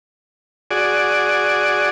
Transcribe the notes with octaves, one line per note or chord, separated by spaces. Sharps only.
F#4 G#4 D5